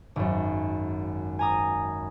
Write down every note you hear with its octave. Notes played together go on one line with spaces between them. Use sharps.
G#1 F#2
G#5 A#5 D#6